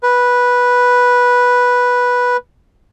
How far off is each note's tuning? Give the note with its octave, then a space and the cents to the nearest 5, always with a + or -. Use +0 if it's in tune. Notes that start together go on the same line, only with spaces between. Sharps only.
B4 -10